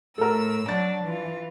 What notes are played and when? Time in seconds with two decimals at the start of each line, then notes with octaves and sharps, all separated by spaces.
0.18 A2 A4 A#4 E6
0.69 F#3 D4 A6
1.04 E3 F4